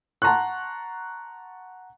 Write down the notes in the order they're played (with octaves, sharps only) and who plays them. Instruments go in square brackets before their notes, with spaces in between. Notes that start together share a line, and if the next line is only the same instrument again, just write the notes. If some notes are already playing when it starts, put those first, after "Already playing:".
[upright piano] F#5 A5 A#5 C6 C#6 F#6